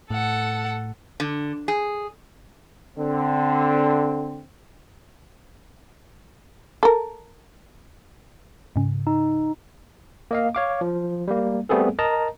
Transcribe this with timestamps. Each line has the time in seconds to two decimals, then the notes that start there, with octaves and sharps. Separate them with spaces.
0.10 A2 A4 F#5
1.20 D3
1.68 G#4
2.98 D3 C4
6.83 A4 A#4
8.76 G#2 C#3
9.07 D#4
10.31 A#3 D#5 F5
10.55 C#5 F5 D6
10.81 F3
11.28 G3 A#3
11.69 G3 A3 B3 C4 G#4 A4
11.99 A#4 D#5 A5 A#5